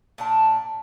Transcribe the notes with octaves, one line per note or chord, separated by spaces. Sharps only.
A#2 D4 A5